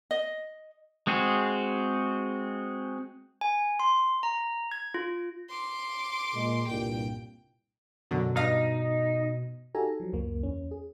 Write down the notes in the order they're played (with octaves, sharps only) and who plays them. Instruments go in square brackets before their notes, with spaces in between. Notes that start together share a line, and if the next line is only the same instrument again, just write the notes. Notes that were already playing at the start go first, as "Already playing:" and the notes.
[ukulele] D#5
[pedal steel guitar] G#3 C4 F#4 G#4
[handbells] G#5
C6
A#5
G#6
F4
[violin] C6 D6
[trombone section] A#2 G#3
[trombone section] C2 G2 A#2 [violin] G5
[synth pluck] F#2 D3 [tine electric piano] B2
[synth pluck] G2 F5 A#6 [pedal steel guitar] D#4
[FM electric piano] D#4 F#4 G4 A4 G#5 A#5
F3 F#3
C#2 F#2 A#3
E2 C#4
G#4